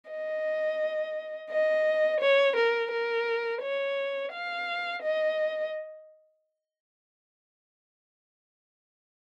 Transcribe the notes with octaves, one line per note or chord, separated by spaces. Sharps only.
D#5
D#5
C#5
A#4
A#4
C#5
F5
D#5